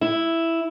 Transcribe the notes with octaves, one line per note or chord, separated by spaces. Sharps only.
E4